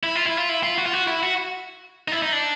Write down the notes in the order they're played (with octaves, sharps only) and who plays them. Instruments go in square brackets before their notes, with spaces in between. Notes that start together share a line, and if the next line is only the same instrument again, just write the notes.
[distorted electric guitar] E4
F4
E4
F4
E4
F4
F#4
F4
F#4
E4
F#4
D#4
E4
D#4
D4